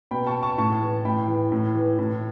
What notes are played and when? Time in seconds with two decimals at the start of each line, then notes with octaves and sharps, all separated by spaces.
0.11 B2 G5 B5
0.27 A5 C#6
0.43 A5 C#6
0.58 A2 A5 C#6
0.81 E3
1.05 A2 G5 B5
1.28 E3
1.52 A2
1.75 E3
1.99 A2